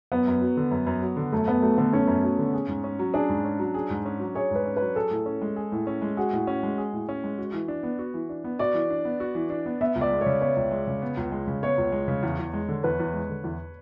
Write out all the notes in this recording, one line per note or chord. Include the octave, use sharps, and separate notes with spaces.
F#2 B3
F#2
F#3
D3
F#2
F#2
F#3
D3
F#2 A3
F#2 B3
F#3 A3
D3 B3
F#2 C#4
F#2
F#3
D3
G#4
G#2
C#4
F#3
D4 G#4
G#2
C#4
F#3
G#4
G#2
C#4
F#3
G#4 C#5
G#2 B4
C#4
B4
F#3
G#4 A4
A2
C#4
G#3
G#4
A2
C#4
G#3
F#4 G#4
A2
C#4
G#3
G#4
A2
C#4
G#3
F#4
E3
D4
B3
F#4
E3
D4
B3
F#4 D5
E3
D4
B3
F#4
E3
D4
B3
B3 E5
C#2
D5
G#3
C#5
C#3
B3 C#5
C#2
G#3
C#3
B3
C#2
G#3
C#3
B3 C#5
C#2
G#3
C#3
E2
E2
G#3
D3
E2 B4
E2
G#3
D3
E2